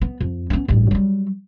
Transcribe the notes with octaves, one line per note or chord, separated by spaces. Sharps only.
B3
F2
B3 C#4
A1 G2
F#3 G3